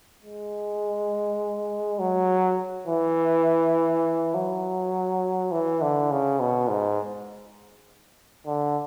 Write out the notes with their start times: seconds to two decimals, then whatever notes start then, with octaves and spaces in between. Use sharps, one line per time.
0.23 G#3
1.99 F#3
2.87 E3
4.34 F#3
5.52 E3
5.82 D3
6.11 C#3
6.40 B2
6.69 G#2
8.46 D3